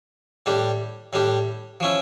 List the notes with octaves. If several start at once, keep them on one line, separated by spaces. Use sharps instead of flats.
A2 G3 D4 G4
A2 G3 D4 G4
F3 C#4 E4